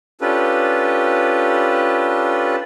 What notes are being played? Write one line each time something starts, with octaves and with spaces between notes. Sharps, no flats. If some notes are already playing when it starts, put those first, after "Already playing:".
C#4 D4 F4 G4 A4 B4